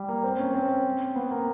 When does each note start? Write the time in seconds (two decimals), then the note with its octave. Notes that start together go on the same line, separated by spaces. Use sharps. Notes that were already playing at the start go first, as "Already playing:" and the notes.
Already playing: G3
0.09 A#3
0.24 C4
0.39 C#4
0.54 C4
1.16 B3
1.31 A#3